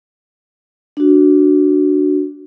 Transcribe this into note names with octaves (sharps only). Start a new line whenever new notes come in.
D4 F#4